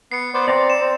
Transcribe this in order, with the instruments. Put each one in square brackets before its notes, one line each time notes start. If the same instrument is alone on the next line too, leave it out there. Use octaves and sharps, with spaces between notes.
[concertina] B3 [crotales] C7 C#7
[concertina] B3 C5 D5
[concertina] C4 [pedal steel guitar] D5 A#5 D6
[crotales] E7
[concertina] C4